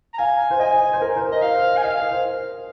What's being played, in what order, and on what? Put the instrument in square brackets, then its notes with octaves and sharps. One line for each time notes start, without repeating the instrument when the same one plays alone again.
[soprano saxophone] A#5
[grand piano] F5 [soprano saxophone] G#5
[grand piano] C5
[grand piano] D#5 [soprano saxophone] G#5
[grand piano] C5
A#4
C5
[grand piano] A#4 [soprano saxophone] D#5
[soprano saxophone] F5
[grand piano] C5
[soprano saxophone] G#5
[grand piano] D#5 [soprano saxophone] F5
[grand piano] A#4
C5